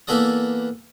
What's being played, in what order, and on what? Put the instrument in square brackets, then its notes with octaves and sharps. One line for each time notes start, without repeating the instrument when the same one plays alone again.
[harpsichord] E3 A#3 B3 A4 D5 D#6